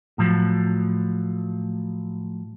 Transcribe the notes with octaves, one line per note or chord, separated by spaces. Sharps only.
A2 F3 F#3